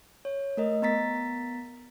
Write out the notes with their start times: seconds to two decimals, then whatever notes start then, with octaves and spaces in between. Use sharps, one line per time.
0.25 C#5
0.57 A3 A#4 D#5
0.82 B3 A#5 A6 B6